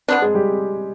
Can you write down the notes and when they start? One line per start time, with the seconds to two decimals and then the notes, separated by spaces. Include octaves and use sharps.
0.08 B2 B3 C4 D4 C5
0.21 G#3 G#4
0.34 G3 G4